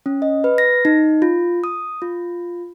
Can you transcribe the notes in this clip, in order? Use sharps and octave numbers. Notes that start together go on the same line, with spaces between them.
C#4
D#5
B4
A#6
D#4
F4
D#6
F4